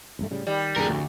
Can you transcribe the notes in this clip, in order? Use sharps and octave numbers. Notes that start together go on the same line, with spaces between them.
A1 G2 A3
A2 C#3 G3
D#3 G3
F2 A2 D3 G#4 A#4
D2